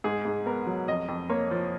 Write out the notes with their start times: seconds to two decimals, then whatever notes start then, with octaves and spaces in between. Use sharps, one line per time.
0.04 G#2 G#4
0.25 G#2
0.46 B3 A#4
0.67 F#3
0.88 F2 D#5
1.08 F2
1.29 A#3 C#5
1.51 F3